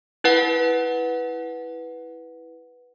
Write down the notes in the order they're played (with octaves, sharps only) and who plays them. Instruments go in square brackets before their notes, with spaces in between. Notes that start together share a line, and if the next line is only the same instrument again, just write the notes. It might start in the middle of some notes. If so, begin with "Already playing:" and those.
[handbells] E4 B4 F#5